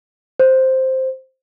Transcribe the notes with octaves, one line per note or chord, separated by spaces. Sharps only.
C5